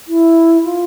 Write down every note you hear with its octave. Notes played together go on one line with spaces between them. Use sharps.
E4
F4